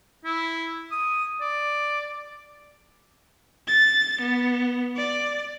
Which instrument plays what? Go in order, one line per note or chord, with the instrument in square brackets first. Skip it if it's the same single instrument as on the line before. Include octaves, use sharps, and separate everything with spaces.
[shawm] E4
D#6
D5
[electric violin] A6
B3
D5